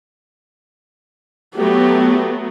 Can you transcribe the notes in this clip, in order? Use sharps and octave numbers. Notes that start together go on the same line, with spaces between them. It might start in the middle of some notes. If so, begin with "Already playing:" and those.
F#3 A3 B3 G4